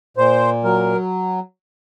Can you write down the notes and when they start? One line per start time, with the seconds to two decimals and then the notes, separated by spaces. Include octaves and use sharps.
0.17 A#2 C5
0.64 F#3 A#4